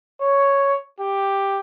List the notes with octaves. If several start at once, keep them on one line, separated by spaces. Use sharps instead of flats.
C#5
G4